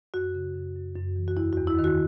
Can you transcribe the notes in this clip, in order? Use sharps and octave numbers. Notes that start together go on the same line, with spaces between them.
F#2 F#4
C#3
F#2
F#2
F#2
E3
F#4
E2 E4
E2 F#4
E4
D#3
F#4